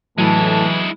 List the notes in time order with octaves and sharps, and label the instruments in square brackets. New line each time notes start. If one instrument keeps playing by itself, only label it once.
[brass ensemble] A2 A5 [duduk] E3 [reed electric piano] F#3 [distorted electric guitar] G#3 E4